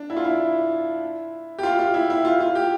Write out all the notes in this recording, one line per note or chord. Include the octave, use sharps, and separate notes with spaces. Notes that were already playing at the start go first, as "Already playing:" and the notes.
Already playing: D4
E4
F4
E4
G4
F4
F4
E4
E4
F4
F4
G4